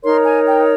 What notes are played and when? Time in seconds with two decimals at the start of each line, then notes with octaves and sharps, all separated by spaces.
0.02 D#4 A#4 C#5 C6
0.24 G#5
0.46 G5